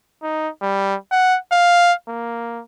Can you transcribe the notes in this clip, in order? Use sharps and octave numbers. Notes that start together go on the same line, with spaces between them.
D#4
G3
F#5
F5
A#3